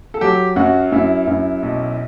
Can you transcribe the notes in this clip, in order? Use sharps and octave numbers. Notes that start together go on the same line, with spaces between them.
A4
F#3 G4
F#2 F#4
F#2 E4
F#2
B1